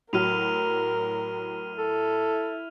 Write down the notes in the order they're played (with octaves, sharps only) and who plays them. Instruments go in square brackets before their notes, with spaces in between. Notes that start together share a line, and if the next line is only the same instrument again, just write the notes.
[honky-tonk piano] A2 F#3 [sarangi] A#4 [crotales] F6 D#7 F7
[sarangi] E4 [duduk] A4